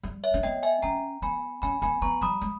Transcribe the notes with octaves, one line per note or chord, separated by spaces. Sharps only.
G3
C#5 E5
C#4
B3 D#5 G5
E5 G#5
C#4 G5 A#5
B3 G#5 B5
C#4 G#5 B5
B3 G#5 B5
B3 A#5 C#6
G3 B5 D#6
G#3